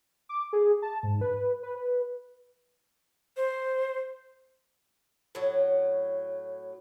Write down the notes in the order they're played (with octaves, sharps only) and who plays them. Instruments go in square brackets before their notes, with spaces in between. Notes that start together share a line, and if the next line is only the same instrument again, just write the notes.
[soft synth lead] D6
G#4
A5
G#2
B4
B4
B4
[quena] C5
[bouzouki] A2 F#3